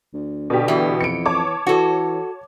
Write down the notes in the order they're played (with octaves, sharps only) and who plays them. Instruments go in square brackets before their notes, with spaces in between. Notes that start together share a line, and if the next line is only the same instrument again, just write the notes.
[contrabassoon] D2
[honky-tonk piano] B2 G4 [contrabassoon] D3
[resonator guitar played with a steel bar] E3 B3
[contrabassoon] F2 [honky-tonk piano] C#7 D7
[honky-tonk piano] C#5 A5 D6
[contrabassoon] E3 [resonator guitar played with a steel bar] F#4 A4